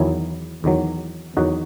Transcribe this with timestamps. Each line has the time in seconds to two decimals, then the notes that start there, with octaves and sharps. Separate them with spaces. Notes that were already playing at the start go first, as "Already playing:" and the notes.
Already playing: E2 D#3 F#3 E4 G#4
0.64 E2 D#3 F#3
1.37 E2 D#3 F#3 D#4 F#4